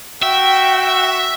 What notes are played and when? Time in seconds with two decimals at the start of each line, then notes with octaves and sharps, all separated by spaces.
0.23 F#4 E5 G5